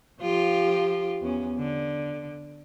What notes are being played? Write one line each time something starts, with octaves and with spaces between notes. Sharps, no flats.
F3 F4 G4
E2 C#4
D3